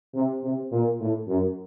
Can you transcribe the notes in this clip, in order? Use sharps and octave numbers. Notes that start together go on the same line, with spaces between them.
C3
C3
A#2
A2
F#2